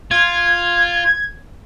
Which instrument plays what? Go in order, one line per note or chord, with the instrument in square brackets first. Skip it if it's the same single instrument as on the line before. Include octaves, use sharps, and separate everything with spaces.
[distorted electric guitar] F4 [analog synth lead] G#6